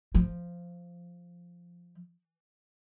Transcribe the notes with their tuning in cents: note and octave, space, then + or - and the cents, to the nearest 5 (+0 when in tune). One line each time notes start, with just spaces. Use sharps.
F3 -5